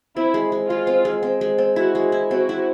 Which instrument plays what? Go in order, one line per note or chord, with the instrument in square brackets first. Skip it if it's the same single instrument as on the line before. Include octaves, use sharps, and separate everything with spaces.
[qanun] C4 [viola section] E4
[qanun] G#3
G#3
[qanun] G#3 [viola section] F4
[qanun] C4
G#3
C4
G#3
C4
[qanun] E4 [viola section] F#4
[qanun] G#3
E4
[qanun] C4 [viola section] F#4
[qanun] E4